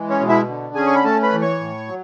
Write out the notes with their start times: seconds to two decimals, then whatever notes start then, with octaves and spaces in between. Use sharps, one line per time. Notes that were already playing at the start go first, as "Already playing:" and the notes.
Already playing: E3 G#3
0.09 C#4 C#5
0.19 B2
0.28 E4 E5
0.47 D3
0.75 C#4 G#4 G#5
0.87 C#6
0.95 B5
1.04 A3 A4 A5
1.22 B4 B5
1.33 E3
1.41 C#5 C#6
1.60 A2
1.88 F#3